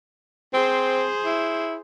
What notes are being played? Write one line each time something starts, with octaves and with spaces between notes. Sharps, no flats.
C4 G#4 C5
E4